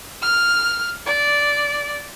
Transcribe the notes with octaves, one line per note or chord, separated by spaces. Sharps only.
F6
D5